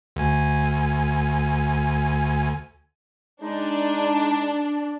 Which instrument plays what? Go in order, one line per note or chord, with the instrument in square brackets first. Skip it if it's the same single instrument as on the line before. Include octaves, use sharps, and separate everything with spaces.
[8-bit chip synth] D2 G#5
[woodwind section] G#3 D#4 [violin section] D4